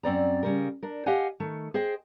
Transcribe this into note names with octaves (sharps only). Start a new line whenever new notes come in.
F#2 C4 D5 A#5
C#3 G3 A#4
D4 A#4
G4 D#5 F5 F#5 G#5
D#3 A3
G#4 C5 D#5 G5